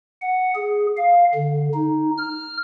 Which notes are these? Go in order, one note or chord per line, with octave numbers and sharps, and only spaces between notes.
F#5
G#4
F5
D3
D#4
F6